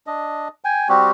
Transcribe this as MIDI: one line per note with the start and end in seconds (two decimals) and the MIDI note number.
0.07 0.48 62
0.07 0.48 75
0.65 0.88 79
0.65 0.88 80
0.89 1.11 55
0.89 1.11 60
0.89 1.11 66
0.89 1.11 67